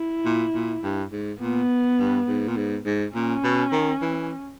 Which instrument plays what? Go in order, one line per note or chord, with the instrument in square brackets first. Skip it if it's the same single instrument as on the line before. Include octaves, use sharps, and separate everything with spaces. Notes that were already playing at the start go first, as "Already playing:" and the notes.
Already playing: [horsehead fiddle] E4
[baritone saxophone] A#2
A#2
G2
G#2
[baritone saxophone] A#2 [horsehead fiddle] B3
[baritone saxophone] G2
G#2
A#2
G#2
G#2
[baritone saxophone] A#2 [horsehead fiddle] C#4
[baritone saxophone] B2
D#3
E3